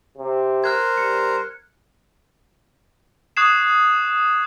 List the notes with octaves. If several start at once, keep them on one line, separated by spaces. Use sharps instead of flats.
C3
A#4 C5 F6 F#6 G#6
G3 C#7
C#6 D#6 F#6 G#6 C7 E7